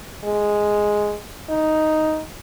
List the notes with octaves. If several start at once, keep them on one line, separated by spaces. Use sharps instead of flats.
G#3
D#4